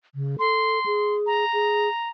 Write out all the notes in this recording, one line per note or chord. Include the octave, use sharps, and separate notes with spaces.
C#3
A4 C6
G#4
A#5
G#4